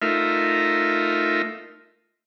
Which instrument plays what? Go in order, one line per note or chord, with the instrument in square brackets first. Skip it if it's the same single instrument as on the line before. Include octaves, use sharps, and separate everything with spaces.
[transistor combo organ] A3 D#4 F4 A#4 E5